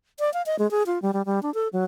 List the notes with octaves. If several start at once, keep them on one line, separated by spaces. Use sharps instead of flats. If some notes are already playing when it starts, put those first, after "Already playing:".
D5
F5
D#5
G#3
G#4
F4
G3
G3
G3
D4
A4
F#3